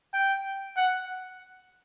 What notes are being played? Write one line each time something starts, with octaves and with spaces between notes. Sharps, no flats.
G5
F#5